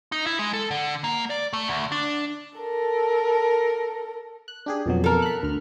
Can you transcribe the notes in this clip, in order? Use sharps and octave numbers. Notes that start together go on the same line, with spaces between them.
D#4
E4
G#3
A4
D3
A#3
D5
A3
D2
D4
A4 A#4
F#6
D4 G4 G#4
F2 B2 F#3
A4 A#4
B5 F#6
D2 F6